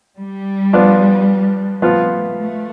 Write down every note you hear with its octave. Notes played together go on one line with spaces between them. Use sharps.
G3
F3 B3 D4 F4
F3 A3 B3 F4
A3